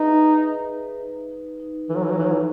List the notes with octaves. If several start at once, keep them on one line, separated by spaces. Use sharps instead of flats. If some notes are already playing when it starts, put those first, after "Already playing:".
Already playing: D#4 G#4 B4 E5
B4
G#4
B4
D#4
D#4
D#4
E3 A4
F#3
E3
F#3
E3 D#4
F#3
E3